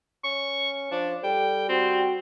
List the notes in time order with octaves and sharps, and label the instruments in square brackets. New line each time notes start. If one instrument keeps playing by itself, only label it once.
[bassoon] C#4 [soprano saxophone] C#6
[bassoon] F3 [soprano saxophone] D4
[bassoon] G3 [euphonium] A4 [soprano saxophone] G5
[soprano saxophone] C4 [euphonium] F#4